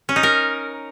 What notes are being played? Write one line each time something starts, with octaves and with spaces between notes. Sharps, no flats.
C#4
D#4
A#4